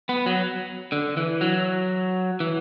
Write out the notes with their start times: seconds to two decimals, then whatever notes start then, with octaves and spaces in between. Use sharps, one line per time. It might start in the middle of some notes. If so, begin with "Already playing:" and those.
0.09 B3
0.26 F#3
0.92 D3
1.17 E3
1.41 F#3
2.40 E3